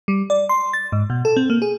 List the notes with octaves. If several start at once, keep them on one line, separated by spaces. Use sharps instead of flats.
G3
D5
C6
A6
G#2
B2
A4
C4
A#3
G#4